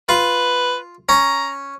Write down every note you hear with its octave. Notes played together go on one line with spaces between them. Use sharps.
F4 B4
C#4 A#5